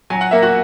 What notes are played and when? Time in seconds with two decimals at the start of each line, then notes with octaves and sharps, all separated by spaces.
0.10 F#3 G#5
0.21 F#5
0.31 A#3 E5
0.42 F#4 F#5